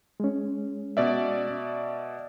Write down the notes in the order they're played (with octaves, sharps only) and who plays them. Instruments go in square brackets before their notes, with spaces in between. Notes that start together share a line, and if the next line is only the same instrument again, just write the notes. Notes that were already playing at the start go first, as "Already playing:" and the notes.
[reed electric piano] G#3 C#4
[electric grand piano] B2 D5 E5